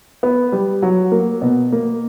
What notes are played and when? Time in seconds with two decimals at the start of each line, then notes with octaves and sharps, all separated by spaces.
0.23 B3
0.52 G3
0.82 F#3
1.12 A#3
1.41 B2
1.72 A#3